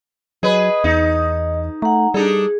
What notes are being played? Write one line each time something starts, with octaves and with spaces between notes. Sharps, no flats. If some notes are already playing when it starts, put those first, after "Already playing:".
F#3 G#4 B4 D#5
E2 D#4
A3 F#5 A#5
G3 D4 D#4 G#4 A4